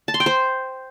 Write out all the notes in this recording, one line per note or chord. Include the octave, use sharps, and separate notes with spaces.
A5
C6
G5
C5